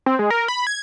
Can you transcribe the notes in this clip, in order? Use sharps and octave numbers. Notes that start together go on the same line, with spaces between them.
C4
G#3
A#4
B5
G#6